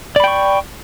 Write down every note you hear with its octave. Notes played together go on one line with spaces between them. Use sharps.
D5 G5 B5 C#6